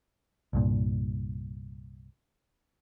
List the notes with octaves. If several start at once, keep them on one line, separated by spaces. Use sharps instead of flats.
C2 G2 A#2